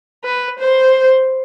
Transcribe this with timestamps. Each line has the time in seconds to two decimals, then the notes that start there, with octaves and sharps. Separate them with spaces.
0.24 B4
0.59 C5